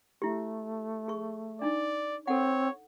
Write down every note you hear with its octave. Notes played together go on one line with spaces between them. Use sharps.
A3 E4 G4
G#4 C#6
D4 D#4 D5
C4 A4 C#5 F#5